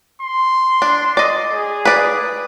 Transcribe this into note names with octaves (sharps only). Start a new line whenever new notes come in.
C6
D4
D5 D#5
G#4
B4 D5